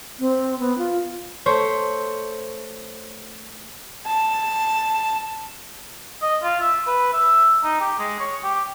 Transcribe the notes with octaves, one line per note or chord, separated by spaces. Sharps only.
C4
B3
F4
A3 C5 C#5
A5
D#5
F4
E5
B4
E5
D#4
G4
G#3
C#5
G4